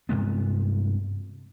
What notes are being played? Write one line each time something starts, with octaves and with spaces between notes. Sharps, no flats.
G2 C3 G#3 B3